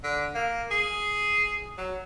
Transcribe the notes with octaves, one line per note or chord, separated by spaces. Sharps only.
D3
A#3
G#4
F#3